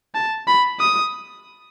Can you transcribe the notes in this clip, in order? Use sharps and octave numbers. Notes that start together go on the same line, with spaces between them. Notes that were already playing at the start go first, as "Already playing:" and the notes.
A5
B5
D#6